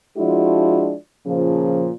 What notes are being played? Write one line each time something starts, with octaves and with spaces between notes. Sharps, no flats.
F3 G#3 D4 E4 F#4
A#2 C#3 F3